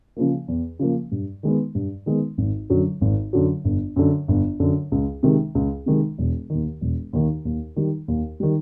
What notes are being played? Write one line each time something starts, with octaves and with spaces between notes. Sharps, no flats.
C#3 F3 A#3
E2
C#3 F3 A#3
G2
D#3 G#3 B3
G2
D#3 G#3 B3
G#1
F#2 D3 F#3
G#1
F#2 D3 F#3
G1
F#2 D3
G1
F#2 D3
C#2
C3 D#3 G#3
C#2
C3 D#3 G#3
E1
D#2 D#3
E1
D#2 D#3
D#2
D#3 G3
D#2
D#3 G3